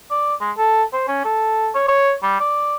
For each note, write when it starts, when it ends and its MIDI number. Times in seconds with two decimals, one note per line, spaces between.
0.11 0.34 74
0.41 0.51 56
0.58 0.83 69
0.93 1.07 72
1.08 1.24 61
1.25 1.69 69
1.75 1.84 73
1.88 2.13 73
2.23 2.39 55
2.40 2.76 74